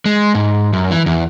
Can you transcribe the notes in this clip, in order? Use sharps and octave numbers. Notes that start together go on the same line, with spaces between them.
G#3
G#2
F#2
E3
E2